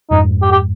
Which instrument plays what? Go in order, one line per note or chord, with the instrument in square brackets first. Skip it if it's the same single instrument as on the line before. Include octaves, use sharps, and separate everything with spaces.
[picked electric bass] F2 G#2 [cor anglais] D#4
[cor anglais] G4
G4